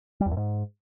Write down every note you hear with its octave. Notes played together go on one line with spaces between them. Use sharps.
G3
E2
F#2
G#2